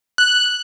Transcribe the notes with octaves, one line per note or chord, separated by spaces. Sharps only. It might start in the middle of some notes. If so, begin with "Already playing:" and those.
F#6